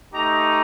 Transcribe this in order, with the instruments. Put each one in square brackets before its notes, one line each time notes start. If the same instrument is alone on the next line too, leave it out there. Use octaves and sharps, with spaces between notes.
[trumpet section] A3 D#4 G4 A#5